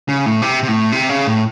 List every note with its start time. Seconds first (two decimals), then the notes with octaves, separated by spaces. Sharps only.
0.09 C#3
0.26 A2
0.42 C3
0.63 C3
0.68 A2
0.92 C3
1.09 C#3
1.27 A2